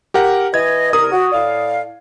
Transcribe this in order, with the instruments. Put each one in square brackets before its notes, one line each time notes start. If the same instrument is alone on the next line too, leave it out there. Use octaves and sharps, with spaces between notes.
[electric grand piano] G4 A#4 F#5
[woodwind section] E3 D#5 [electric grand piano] G#6
[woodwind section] C2 A#4 [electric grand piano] D#6
[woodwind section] F#4
A2 D5 F5